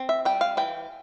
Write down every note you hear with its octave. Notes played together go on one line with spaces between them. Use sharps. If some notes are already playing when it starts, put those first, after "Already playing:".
Already playing: C4
E5
G3 G5
F5
E3 G5